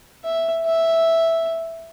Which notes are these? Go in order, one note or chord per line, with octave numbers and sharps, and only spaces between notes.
E5
E5